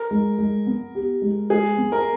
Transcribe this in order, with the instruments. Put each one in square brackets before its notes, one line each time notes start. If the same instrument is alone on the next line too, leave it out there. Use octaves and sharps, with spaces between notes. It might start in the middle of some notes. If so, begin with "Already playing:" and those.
Already playing: [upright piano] A#4
[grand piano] G#3
G#3
B3
G4
G#3
[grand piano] G#3 [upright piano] G#4
[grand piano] B3
[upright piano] A#4